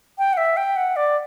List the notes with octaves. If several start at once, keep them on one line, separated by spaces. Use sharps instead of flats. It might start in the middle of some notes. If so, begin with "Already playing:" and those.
G5
F#5
E5
G5
F#5
D5